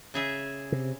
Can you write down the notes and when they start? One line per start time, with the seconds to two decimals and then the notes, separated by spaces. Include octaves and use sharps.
0.14 C#3 G#4 E5
0.72 C3